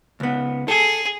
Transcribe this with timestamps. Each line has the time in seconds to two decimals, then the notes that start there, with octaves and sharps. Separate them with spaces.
0.20 C#2 B3
0.68 G#4 A4